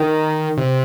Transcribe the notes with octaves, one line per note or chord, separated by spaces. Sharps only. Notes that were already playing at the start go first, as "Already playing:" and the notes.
Already playing: D#3
C3